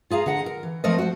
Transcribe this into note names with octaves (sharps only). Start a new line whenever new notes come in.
F4 G#4 F5 A#5
D3 D#5 F#5 A#5
A#4
E3
F3 A3 C4 A#4 C5 D#5
F#4 C5